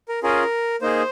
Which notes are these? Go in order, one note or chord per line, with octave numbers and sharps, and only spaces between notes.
A#4
C#4 F4 G#4 A#4
A#3 D#4 G#4 C5